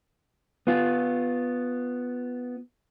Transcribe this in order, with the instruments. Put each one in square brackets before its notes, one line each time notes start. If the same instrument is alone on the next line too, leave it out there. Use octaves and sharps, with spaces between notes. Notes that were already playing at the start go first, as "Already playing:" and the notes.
[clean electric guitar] B3 F4